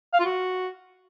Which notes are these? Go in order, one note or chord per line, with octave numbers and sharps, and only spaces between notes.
F5
F4
F#4